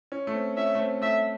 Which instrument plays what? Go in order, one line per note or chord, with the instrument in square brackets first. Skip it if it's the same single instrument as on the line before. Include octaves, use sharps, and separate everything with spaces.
[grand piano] C#4
A3
C4
[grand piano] C#4 [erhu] E5
[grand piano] A3
C4
[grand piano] A3 [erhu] E5